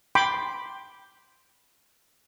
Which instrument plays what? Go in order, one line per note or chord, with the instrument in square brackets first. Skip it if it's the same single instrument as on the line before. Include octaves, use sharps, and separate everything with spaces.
[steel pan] G5 B5 C6 D6